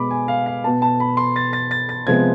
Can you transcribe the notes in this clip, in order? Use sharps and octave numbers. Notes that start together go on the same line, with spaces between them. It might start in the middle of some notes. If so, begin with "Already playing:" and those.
Already playing: B2 G#3 B3 B5 D6
G#5
F5
F5
B2 B3 A5
A5
B5
C6
A6
A6
A6
A6
C3 F3 G#3 B3 G#6